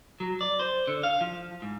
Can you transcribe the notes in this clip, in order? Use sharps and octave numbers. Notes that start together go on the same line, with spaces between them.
F#3
D5
C5
D3
F5
F3
G#2